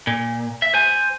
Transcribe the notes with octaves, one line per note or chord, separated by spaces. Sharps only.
A#2
E5
C5 G#5